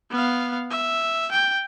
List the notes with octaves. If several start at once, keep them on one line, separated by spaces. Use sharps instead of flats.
B3 F5
E5
G5